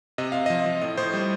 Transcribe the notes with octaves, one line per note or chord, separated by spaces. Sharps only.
C3 D#5
C3 F5
F3 D#5
F3
A2 D#5
A2 C5
G3